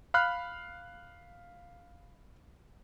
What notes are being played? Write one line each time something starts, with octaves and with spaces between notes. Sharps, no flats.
F5 B5 F6 F#6